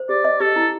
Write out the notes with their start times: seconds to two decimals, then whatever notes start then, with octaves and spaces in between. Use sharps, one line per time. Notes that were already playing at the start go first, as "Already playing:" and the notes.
Already playing: C5
0.09 G4 D5
0.25 D#5
0.40 G4 A4
0.56 E4